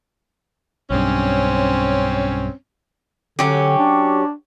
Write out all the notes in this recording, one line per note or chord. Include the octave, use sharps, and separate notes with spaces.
B1 G2 C4 C#4
D3 F#3 C#4 G4
D4